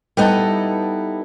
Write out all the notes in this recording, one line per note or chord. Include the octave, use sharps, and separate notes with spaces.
G3 B3 D#4 E4 A4